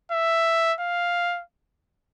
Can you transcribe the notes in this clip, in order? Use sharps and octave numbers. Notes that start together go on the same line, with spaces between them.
E5
F5